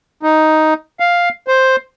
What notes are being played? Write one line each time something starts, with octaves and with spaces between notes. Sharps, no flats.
D#4
F5
C5